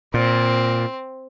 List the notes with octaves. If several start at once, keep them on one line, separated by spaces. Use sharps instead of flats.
A#2 C4